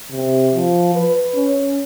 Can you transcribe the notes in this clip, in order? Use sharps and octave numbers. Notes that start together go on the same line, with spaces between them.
C3
F3
B4
C#4